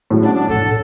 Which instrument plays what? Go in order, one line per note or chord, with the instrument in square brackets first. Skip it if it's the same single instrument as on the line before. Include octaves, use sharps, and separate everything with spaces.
[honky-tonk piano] A2 F#3 G#3
[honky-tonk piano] C#4 F#5 [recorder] D4
[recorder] D4
[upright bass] G#2 B3 [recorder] A4
[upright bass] A2